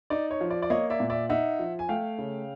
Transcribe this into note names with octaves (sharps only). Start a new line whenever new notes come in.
D#4 D5
C#5
F3
D5
D5
A#3 C#5 D#5
D5 E5
A#2
D5 E5
D#4 E5 F#5
F3
G#5
A3 F5 G5
C#3